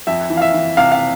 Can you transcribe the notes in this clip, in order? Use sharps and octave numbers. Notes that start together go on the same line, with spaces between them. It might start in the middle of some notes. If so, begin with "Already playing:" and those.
F2 E5
E3
F5
E5
E3
C3 F5
F5